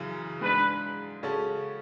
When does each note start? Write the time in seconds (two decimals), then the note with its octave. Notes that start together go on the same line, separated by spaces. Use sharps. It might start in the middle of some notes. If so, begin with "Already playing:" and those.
Already playing: F#2 C#3 E3
0.41 G#2 G#3 D4 B4
1.23 C#3 G#3 C#4 F#4 A4